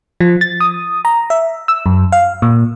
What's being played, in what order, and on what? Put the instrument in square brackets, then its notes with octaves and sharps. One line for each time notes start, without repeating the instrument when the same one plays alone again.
[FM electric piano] F3
A6
D#6
A#5
E5
E6
F#2
F5
A#2